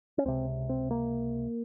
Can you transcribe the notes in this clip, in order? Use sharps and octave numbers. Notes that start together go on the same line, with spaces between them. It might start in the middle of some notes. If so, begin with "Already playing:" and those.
C#4
C#2 C3 C4
C4
A#3